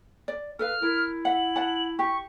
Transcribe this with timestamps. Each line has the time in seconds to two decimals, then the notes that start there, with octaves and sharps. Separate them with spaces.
0.28 D5
0.59 A4 B4 F5 F6
0.82 E4 A#4
1.25 E5 F#5 F#7
1.56 F#5 A5
1.99 G4 C#6